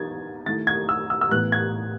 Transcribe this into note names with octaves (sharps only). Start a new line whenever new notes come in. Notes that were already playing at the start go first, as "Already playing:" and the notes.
Already playing: E3 B3 D#4 G#6 A6
D#3 A3 E4 A6
G#6
E6
E6
E6
A2 E3 B3 F#6
G#6